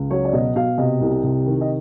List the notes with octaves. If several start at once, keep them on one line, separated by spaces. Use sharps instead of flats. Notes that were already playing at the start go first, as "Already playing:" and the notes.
Already playing: C#2
F#3 C#5
D5
B2 D#5
B2 F5
C3 D#5
C2
C3
D#3
D#5